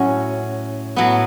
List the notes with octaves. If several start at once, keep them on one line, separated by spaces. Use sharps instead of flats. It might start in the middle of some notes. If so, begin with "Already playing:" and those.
Already playing: A2 F#3 C#4
A2 F#3 B3